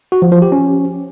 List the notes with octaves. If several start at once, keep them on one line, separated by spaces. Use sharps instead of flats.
F#4
F3
F3
G4
C#4